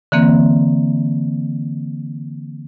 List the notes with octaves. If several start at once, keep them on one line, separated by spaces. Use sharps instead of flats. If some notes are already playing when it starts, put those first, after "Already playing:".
D3 E3 A#3 C4